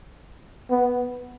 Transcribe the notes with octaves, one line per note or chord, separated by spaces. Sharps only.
B3